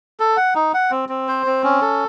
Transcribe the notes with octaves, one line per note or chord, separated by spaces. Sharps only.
A4
F#5
D#4
F#5
C4
C4
C5
C4
C#4
A4